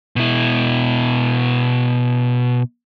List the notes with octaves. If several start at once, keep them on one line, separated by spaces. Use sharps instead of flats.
B2 E4